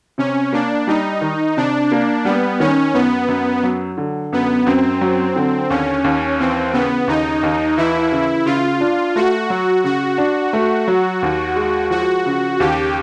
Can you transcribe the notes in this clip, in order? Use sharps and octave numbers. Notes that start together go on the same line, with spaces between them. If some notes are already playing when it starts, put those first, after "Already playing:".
C3 C#4
A#3 D4
G3 D#4
D#3
C3 D4
A#3
G3 B3
D#3 C#4
F#2 B3
F#2
F#3
D3
F#2 B3
F#2 C4
F#3
D3
D#2 C#4
D#2
E3 C4
C#3 B3
D#2 D#4
D#2
E3 E4
C#3
C#3 F4
D4
A3 F#4
F#3
C#3 F#4
D4
A3
F#3
D#2
G#3
F3 F#4
C#3
D#2 G4